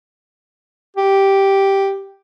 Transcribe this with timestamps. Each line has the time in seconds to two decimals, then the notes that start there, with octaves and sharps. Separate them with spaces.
0.97 G4